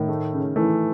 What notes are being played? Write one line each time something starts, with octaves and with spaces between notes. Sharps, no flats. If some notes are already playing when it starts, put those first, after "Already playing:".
Already playing: A2 D#3
A3
C#3
E3 A3